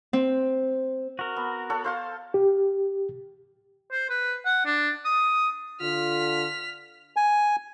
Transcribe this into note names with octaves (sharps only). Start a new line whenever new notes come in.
C4
F#4 A#4
B3
A4 C#5 F#5
C5 F5 C6
G4
C5
B4
F#5
D4
D#6
D3 F4 F6 B6
G#5